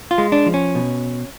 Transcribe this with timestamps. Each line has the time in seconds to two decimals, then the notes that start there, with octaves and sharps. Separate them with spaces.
0.11 F4
0.18 G#3
0.32 D4
0.46 F3
0.54 C#4
0.75 B2